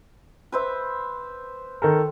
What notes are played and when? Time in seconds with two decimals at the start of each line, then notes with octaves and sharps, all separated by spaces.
0.52 B4 C5 E5
1.82 D#3 A4 A#4